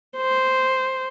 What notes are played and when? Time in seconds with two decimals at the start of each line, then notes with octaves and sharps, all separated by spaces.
0.17 C5